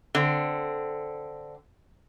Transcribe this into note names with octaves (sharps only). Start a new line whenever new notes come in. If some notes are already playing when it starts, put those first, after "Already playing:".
D3 C4